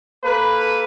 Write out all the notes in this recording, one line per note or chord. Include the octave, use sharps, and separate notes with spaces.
A#3 A4 B4